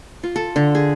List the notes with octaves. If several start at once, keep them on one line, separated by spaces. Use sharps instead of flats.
F4
A4
D3
G#4